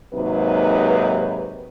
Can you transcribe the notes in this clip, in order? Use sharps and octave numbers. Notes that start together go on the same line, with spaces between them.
G#2 C3 F#3 A#3 D#4 B4